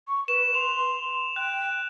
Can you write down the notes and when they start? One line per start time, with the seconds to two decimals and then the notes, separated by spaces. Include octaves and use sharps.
0.08 C#6
0.28 B4 E7
0.54 C6 F7
1.36 G5 F#6